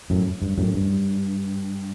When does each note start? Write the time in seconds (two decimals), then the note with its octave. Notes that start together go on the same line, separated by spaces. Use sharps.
0.10 F#2 A2
0.42 G2
0.58 F#2 A2
0.74 G2